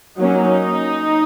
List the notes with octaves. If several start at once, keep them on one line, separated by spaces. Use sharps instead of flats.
F#3 A#3 C#4 D#4